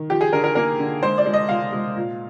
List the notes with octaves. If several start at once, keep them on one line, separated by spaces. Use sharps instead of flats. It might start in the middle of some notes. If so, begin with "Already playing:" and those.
Already playing: D#3
F3 G4
G#4
D3 A#4
A#4
A#3 A#4
D3
G#3 C5
D5
G#3
D#5
G#3 F5
G#3
A#2